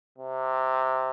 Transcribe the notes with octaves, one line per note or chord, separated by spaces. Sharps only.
C3